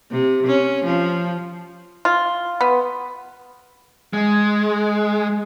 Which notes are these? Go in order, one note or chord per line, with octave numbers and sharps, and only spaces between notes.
C3
C#4
F3
F4
B3
G#3